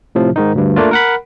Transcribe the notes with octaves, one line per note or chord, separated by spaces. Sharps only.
A2 C3 F3
G#2 D#3 D#4
D2 G2
A3 A#3 D4 F4
A#4 F#5 B5